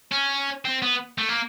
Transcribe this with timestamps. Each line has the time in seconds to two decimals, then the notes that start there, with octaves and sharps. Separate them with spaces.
0.12 C#4
0.65 C4
0.82 B3
1.18 A3
1.29 A#3